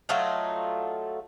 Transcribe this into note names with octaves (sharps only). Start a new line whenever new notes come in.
F#3 A3 D#4 F4